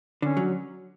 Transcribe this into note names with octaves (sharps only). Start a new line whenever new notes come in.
D3 C#4
F#3